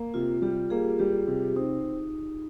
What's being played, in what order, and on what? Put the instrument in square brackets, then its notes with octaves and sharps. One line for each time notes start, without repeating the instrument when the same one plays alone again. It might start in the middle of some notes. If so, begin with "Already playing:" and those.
Already playing: [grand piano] A#3
[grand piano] C3 [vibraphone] F4
[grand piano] G3 [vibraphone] G4
[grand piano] A#3 [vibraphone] G#4
[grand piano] G3 [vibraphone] G4
[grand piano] C3
[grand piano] C4 [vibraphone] D#4